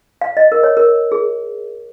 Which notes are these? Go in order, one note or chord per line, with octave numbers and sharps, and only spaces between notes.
F5
D#5
A#4
C#5
A#4
G#4